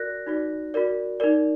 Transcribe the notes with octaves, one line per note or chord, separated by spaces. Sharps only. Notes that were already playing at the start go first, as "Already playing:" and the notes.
Already playing: F#4 A#4 D5 F#6 A#6
D#4 F#4 D5
F#4 A#4 D5
D#4 A#4 D5